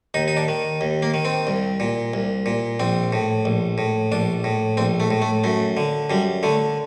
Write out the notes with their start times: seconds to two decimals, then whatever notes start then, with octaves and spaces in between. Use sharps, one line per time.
0.14 D#2 D#4
0.28 D#4
0.37 D4
0.48 D#3
0.81 D#2
1.02 A#3
1.14 D#3
1.25 C4
1.47 C2
1.80 A#2
2.14 C2
2.46 A#2
2.80 A#1 C4
3.12 A2
3.45 A#1
3.78 A2
4.12 A#1 D4
4.44 A2
4.77 A#1 C4
5.00 A3
5.11 A2
5.22 A3
5.44 F#2 A3
5.77 D3
6.10 F#2 G3
6.43 D3 A3